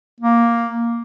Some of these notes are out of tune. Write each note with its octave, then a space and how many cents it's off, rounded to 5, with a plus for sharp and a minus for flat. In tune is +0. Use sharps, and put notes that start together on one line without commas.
A#3 +5